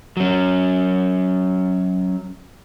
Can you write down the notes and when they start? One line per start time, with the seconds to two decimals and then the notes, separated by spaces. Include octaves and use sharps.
0.17 F#3 C#4